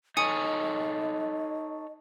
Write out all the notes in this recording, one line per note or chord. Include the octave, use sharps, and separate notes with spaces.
D#4 A4 C#5 D#5 G#5 D#6 C#7